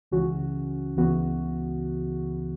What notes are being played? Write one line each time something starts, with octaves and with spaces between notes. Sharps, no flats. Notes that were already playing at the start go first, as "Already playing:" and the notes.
C#2 C#3 E3 C#4 F#4
C#2 C#3 E3 B3 F#4